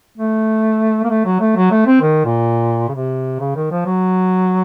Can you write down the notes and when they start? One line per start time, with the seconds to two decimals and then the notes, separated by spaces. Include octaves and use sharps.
0.18 A3
1.04 A#3
1.10 A3
1.25 F#3
1.40 A3
1.56 F#3
1.71 A3
1.87 C4
2.02 D#3
2.25 A#2
2.89 C#3
2.95 C3
3.40 C#3
3.56 D#3
3.71 F3
3.86 F#3